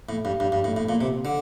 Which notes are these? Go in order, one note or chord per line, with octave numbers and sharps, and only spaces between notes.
A2
G2
G2
G2
A2
A2
A#2
C3
D3